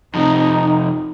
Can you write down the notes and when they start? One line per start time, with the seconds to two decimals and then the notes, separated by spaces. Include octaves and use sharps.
0.15 F2 C3 D#4